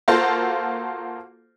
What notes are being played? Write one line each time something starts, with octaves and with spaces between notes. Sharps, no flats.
A#3 F4 F#4 A4 C5